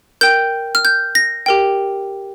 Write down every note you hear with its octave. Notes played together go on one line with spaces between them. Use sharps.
A#4 G5 G6
F6
G6
A#6
G4 A#4 G5